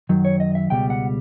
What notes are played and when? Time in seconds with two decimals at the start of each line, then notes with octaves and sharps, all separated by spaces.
0.09 F#2 D#3 F#3
0.25 C#5
0.40 D#5
0.55 E5
0.70 C#2 B2 G3 G5
0.90 F#5